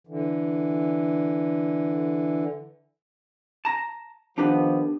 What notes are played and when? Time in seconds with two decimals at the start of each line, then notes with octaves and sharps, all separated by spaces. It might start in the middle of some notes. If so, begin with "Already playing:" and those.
0.07 D3 E3
3.65 A5 A#5
4.38 D#3 F3 B3 D4 G4 B4